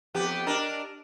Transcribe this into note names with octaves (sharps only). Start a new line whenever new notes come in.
F2 B3 G4
D4 A#4 D#5